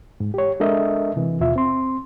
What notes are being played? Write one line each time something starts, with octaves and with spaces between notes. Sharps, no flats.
G#2
G4 C#5
G#3 D4 A4 A#4 D#5 E5
C3 E3
D#2 B2 F4 E5
C4 C6